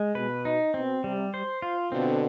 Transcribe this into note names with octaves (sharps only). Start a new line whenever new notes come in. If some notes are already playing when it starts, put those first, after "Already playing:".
Already playing: G#3
B2 B4
D#4
B2 C4
C3 G3
C5
F4
B2 D3 C4